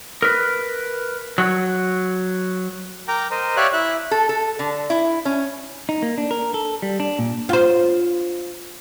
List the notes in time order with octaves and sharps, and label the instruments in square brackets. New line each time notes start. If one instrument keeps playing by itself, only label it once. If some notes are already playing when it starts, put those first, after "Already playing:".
[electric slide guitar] A#4 B4
F#3
[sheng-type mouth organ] A#4 G5 A#5 D6
A#4 C5 D#5
G4 C#5 D5 E5 F5 F#6
E4 E5 F#6
[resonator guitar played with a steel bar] A4
A4
D3
E4
C#4
[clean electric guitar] D#4
A#3
D4
A#4
A4
G3
D4
A#2
[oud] F4 C5